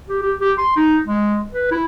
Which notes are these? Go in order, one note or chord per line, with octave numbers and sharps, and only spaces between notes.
G4
G4
G4
C6
D#4
G#3
B4
E4